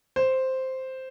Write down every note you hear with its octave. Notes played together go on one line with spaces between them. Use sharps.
C5